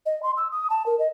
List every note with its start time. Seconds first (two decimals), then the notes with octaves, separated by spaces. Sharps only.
0.06 D#5
0.23 C6
0.37 E6
0.52 D#6
0.70 A5
0.86 A#4
0.99 D#5